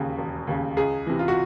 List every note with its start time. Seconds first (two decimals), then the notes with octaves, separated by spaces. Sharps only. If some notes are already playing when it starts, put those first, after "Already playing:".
Already playing: E1 D#2 C#3
0.18 E1
0.47 D#2 C#3
0.77 C#2 G#4
1.06 C3 E3
1.19 F4
1.28 F#4